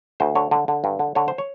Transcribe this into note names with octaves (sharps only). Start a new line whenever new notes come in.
D2 C5
D3 C#5
D3
D3
G2
D3
D3 C#5
C5
C#5